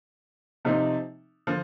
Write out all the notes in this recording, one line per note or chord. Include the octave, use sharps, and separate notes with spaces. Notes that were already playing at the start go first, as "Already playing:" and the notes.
C3 F3 C4 D#4
D3 F3